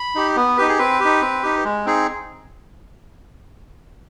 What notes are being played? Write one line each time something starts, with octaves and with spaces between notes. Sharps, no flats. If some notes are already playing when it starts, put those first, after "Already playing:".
Already playing: B5
D#4 G4
B3
D#4 G4 B4
G#4
C4 B4
D#4 G4
C4
D#4 G4
G#3
C4 D#4 G#4